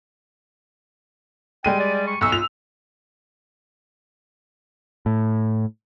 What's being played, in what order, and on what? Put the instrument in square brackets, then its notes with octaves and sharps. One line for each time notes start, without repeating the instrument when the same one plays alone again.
[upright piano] G3 G#3 D#7 [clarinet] G5
[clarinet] D5
C#6
[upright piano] B1 E6 [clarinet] C#6
[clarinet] F4 [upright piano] F7
[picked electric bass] A2